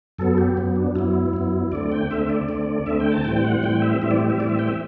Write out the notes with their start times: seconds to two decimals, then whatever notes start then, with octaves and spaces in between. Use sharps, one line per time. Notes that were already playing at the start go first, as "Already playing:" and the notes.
0.19 F#2 F#3 B3 A4
0.38 G4
0.57 F#2 F#3 B3
0.76 D4
0.95 F#2 F#3 B3 E4
1.33 F#2 F#3 B3
1.72 D2 D3 A3 C4 D5
1.92 G5
2.11 D2 D3 A3 C4 E5
2.29 D5
2.49 D2 D3 A3 C4
2.86 D2 D3 A3 C4 E5
3.00 G5
3.12 A5
3.25 A2 E3 G3 C4 G5
3.44 F#5
3.63 A2 E3 G3 C4 G5
3.82 E5
4.02 A2 E3 G3 C4 E5
4.11 D5
4.20 G4
4.30 E5
4.39 A2 E3 G3 C4 D5
4.49 E5
4.59 G5
4.68 E5